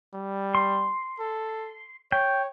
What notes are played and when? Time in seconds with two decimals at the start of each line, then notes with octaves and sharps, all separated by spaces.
0.14 G3
0.55 C6
1.20 A4
2.12 C#5 G5